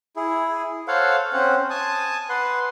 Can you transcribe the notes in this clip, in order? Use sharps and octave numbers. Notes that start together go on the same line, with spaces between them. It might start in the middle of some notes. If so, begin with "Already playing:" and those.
E4 G#4
A4 C5 C#5 F5 F#5
C4 C#4 C5 F#5
G#5 A5 D#6
B4 F#5 C6